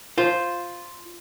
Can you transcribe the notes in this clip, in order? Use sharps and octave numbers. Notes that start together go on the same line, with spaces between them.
F4 C5